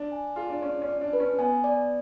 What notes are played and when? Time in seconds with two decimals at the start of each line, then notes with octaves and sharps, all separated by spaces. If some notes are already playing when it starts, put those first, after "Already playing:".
Already playing: D4
0.12 G#5
0.36 F4 G#4
0.50 D4
0.62 C#4 D5
0.82 C#4
0.88 D5
1.01 D4
1.13 B4
1.20 C#4
1.39 B3 G#5
1.64 D5